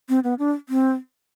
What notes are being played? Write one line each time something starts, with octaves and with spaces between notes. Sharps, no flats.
C4
B3
D4
C4